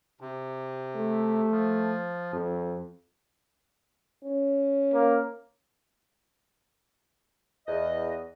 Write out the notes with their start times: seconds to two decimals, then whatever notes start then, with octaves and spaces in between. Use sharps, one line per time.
0.21 C3
0.95 A3
1.51 F3
2.33 F2
4.24 C#4
4.94 A#3
7.68 E2 D#5